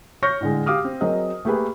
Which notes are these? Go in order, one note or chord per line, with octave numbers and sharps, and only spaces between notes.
C#5 C#6 F6 G6 A#6
A2 D3 G#3
G4 F5 D6 D#6 F6
C4
F#3 C4 G#4 A#4 D#5
A3 A#3 G4 G#4 B4